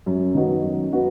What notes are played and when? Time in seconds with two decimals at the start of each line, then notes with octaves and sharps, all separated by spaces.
0.06 F#2
0.35 D#3 B3 D#4 F#4
0.64 F#2
0.92 B3 D#4 F#4